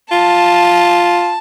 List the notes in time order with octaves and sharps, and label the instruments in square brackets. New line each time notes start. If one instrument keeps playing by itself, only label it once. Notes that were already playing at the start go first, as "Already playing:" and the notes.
[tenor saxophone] F4 [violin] A5